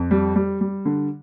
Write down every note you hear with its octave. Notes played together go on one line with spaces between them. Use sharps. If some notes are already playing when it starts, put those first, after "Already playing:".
Already playing: F2
G3
G3
G3
D3